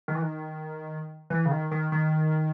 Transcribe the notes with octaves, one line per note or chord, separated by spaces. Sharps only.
D#3
E3
D#3
E3
C#3
D#3
D#3
D#3